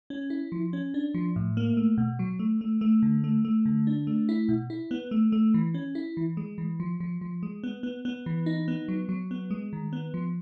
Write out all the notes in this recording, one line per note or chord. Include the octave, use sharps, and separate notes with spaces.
C#4
E4
F3
C#4
D4
F3
A2
A#3
A3
B2
F#3
A3
A3
A3
D3
A3
A3
D3
D4
A3
E4
B2
E4
B3
A3
A3
E3
C#4
E4
E3
G#3
E3
F3
F3
F3
G#3
B3
B3
B3
E3
D#4
B3
F#3
F#3
B3
G#3
D#3
B3
F3